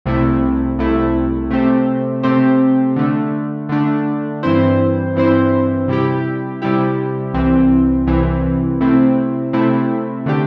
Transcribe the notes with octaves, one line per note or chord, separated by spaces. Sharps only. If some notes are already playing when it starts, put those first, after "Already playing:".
C2 C3 A3 E4
C2 C3 A3 E4
C3 A3 C4 G4 C5
C3 A3 C4 G4 C5
D3 A3 D4
D3 A3 D4
G2 E3 C4 E4 C5
G2 E3 C4 E4 C5
C3 G3 E4 G4
C3 G3 E4 G4
C2 C3 E3 C4
C2 C3 E3 C4
C3 A3 C4 E4
C3 A3 C4 E4
D3 A3 D4 G4